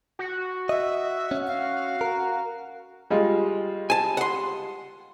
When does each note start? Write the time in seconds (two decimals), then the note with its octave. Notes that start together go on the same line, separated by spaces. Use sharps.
0.19 F#4
0.69 D#5 E5
1.31 C#4
1.47 F5
2.01 A#4
3.10 G3 G#3 F4
3.90 G#5 A5
4.17 F#5 C6